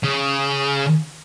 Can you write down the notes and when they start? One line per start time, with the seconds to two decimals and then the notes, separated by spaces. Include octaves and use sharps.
0.03 C#3